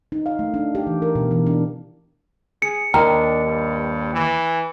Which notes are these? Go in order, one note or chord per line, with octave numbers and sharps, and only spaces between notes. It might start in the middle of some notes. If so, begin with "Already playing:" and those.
D#4
F5
A3
D4
G4
E3
A#4
B2
E3
D4
G#4 C#7
D#2 D4 G5 A#5 F6
G2
E3